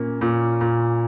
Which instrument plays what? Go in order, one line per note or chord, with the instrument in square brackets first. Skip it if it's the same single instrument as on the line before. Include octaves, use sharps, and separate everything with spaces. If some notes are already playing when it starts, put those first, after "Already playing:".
Already playing: [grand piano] A#2 A#3 C#4
A#2
A#2